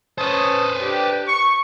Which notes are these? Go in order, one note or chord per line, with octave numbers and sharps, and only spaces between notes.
C#4 B4 C5 A5 D#6
D4 G4
C#6